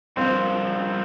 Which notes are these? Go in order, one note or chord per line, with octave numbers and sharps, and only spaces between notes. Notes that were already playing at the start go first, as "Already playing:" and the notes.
G2 F3 A#3 C4